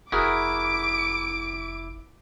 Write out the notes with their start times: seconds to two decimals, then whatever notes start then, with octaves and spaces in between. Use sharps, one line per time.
0.12 F1 E4 F#4 G#4 A#4 D6 D7